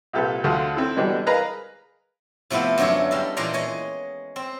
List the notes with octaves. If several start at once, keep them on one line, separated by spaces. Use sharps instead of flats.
C2 A#2 G4 A4 B4
D2 D3 F3 F4 F#5
C4 E4 A4
B2 D3 E3 G3 G#3 D4
G#4 A#4 B4 D#5 F5 A#5
C3 F3 A3 B3 E4
F#2 D3 D4 G#4 C#5
G3 G#3 A4
A#2 E3 G#3 G#4 D5 A#5
G#3 C#5 D#5 G#5
C4